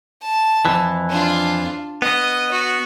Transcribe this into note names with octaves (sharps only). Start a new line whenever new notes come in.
A5
F2 E3
D4 F4
B3 D#5
F#4